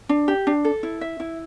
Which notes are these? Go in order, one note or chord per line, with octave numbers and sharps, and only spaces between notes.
D4
G4
D4
A4
E4
E5
E4